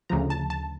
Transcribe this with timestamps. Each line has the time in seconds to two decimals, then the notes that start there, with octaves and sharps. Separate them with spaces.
0.09 D2 C#3 F3 A#5
0.30 A5
0.50 A5